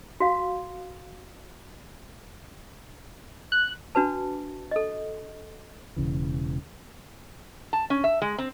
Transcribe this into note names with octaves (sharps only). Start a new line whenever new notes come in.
F#4 F5
F#6
D4 F#4 B4 A5
A4 D#5
E1 C#2 C#3 E3
A5
C#4
E5
G#3
C4